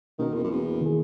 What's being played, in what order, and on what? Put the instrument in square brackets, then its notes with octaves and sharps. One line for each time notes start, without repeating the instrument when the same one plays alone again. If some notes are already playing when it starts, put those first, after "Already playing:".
[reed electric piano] B2 A#3 C#4 F#4 A#4 [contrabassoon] D#3
[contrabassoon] E2
F#2
E2
[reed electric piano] D#3 A#3 E4 G#4